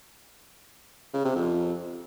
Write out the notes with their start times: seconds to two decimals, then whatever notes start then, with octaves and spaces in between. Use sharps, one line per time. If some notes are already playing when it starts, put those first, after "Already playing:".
1.14 C#3
1.25 C3
1.36 F2